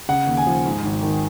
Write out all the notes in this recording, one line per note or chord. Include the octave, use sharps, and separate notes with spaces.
C#3 F#5
D#2
G#5
F3
G#2
G#1
D#3